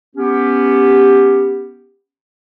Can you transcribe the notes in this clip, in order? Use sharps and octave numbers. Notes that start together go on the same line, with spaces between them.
B3 C#4 G4